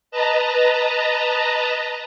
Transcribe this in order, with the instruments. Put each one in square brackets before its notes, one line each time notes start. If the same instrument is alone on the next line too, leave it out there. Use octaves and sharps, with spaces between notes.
[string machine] B4 D#5 A5 A#5